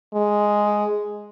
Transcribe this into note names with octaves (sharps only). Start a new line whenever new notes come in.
G#3